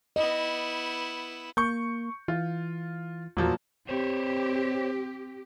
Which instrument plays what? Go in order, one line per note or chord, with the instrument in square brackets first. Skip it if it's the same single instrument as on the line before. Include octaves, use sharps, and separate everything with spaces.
[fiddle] B3 E4 [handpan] D#5
[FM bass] A#3 [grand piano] C#6 G6
[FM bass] E3 [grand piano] F4
[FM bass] E2 [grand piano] A#2 F3 F#3
[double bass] C4 [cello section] G4 [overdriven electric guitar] C5 C#5